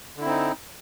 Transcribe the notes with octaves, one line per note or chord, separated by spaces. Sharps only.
D3 C4 D#4 E4